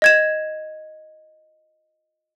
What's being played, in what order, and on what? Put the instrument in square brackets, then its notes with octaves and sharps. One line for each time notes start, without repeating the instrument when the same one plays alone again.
[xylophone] D#5 G#6 E7